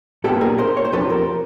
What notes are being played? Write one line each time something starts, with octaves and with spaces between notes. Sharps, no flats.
B1 A#2 G3 B3 G4 A4
G#4 A#4
A#4 C5
C#5
C5
E2 C3 F3 A4 B4
A#4 C5